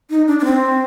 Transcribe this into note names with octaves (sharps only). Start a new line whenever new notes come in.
D#4
D4
D4
C4